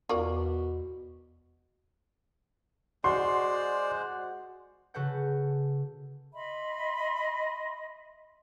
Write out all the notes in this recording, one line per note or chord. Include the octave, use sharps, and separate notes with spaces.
E2 B2 F4 A#4 D5 C#6
G#3 F#4 C5 D5 C6
C#3 F#4 A4 B4 F#5 G6
D#5 E5 B5 C6